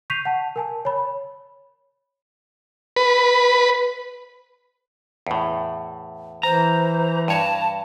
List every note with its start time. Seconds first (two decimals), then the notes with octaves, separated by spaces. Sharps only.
0.10 C#6 G6 B6 C7 D#7 F7
0.25 F#5 A5
0.56 A#4 G#5 A5
0.85 C#5 B5
2.96 B4
5.27 E2 A2
6.43 E3 C5 A#5
7.28 G2 C#5 A5